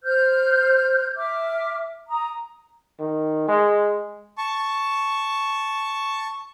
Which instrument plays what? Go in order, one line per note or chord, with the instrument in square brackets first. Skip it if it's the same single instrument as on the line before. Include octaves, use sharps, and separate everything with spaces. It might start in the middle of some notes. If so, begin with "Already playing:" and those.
[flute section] C5 F6 G6
E5 D6 F6
A#5 D#6
[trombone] D#3
G#3
[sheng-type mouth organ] A5 C#6